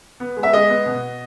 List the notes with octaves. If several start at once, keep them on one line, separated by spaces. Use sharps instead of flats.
B3
G#3
E5
G#3 D#5
B3
B2